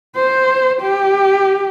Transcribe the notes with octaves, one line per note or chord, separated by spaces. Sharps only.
C5
G4